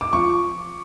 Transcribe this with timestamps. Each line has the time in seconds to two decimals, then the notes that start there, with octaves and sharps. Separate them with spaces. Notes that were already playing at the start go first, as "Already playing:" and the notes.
0.01 D6
0.13 F3 C#6